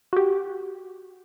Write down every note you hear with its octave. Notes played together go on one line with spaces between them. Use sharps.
F#4 G4